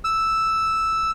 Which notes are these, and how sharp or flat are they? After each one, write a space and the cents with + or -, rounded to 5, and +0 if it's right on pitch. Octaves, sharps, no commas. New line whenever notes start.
E6 +0